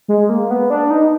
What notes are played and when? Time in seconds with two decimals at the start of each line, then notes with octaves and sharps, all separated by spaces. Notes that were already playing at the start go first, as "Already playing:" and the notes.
0.08 G#3
0.29 A#3
0.51 B3
0.70 D4
0.90 D#4